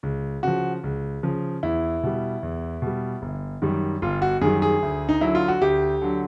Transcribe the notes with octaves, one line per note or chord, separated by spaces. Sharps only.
C#2
C#3 F3 F#4
C#2
C#3 F3
E2 E4
B2 G3
E2
B2 G3
G1
F#2 D#3 G3
G1 F4
F#4
F#2 D#3 G3 G#4
G#4
D2
D#4
D3 F#3 E4
F4
F#4
D2 G4
D3 F#3